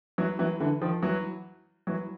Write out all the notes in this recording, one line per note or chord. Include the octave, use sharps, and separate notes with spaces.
E3 F#3
E3 F#3
D3 E3
D#3 F3
E3 F#3
E3 F#3